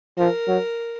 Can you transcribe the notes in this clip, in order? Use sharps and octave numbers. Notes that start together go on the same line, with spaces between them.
F3 A#4
F#3